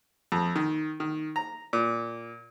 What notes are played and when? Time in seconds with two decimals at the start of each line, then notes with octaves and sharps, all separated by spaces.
0.32 F2
0.56 D#3
1.00 D#3
1.36 A#5
1.73 A#2